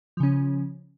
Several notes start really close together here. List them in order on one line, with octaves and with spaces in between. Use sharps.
F3 C#3 C#4